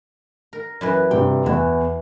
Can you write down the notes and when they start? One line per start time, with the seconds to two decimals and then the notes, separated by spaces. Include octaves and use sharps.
0.53 A#4
0.81 F#2 E3 B4
1.11 G2 C3 G5
1.46 E2 E3